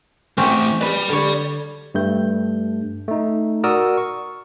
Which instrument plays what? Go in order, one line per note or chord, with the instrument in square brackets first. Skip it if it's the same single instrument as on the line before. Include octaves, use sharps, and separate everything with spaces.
[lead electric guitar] E3 A3 [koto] C4 C#4 F#4
[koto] B4 [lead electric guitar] D5 B5
[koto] D3 C#5
[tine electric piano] G2 A3 G6
A3 D#4
F#4 A#4 D5 D#6 E6
C#6